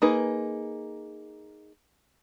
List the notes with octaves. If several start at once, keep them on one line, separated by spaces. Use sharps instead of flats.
A#3 D#4 G#4 B4